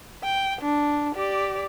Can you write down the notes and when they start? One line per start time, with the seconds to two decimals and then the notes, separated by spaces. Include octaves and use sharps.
0.24 G5
0.61 D4
1.15 G4 D5